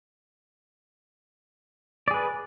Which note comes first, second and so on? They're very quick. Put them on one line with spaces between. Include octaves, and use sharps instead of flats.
D5 G#4 B4